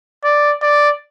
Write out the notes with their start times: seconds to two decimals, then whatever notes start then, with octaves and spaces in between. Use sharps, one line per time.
0.24 D5
0.62 D5